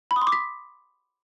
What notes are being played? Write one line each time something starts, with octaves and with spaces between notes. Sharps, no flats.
B5
D#6
C6
D6
B6